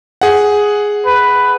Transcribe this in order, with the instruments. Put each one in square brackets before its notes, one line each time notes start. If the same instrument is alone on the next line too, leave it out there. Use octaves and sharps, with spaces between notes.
[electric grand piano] G#4 F#5
[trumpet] B4